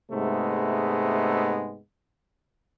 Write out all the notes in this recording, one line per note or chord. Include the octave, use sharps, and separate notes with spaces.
G#2 C3 G#3 A3 B3